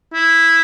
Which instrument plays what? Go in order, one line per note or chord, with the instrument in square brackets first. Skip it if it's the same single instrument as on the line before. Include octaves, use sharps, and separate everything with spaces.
[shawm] E4